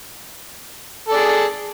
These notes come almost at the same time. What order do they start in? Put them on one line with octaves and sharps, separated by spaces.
A4 D5 G#4